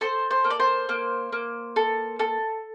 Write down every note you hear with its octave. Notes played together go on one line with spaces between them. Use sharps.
A4 C5
C5
A#3
D5
C5
A#3
A#3
A4
A4